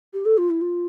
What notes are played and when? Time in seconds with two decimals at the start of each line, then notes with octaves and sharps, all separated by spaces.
0.14 G4
0.25 A4
0.38 F4
0.50 E4
0.61 F4